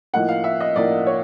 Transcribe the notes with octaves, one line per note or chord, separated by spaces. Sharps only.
A2 F3 A#3 D#4 F#5
F5
E5
D#5
A2 F3 A#3 D#4 D5
C#5